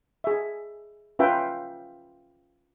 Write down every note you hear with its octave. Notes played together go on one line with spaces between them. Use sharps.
G#4 E5
C#4 F4 B4 E5 F5 G5